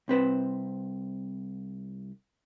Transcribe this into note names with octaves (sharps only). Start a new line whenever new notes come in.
C2 C4 B4 C5